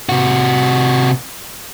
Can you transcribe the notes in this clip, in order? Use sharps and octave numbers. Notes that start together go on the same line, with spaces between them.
C3 F#4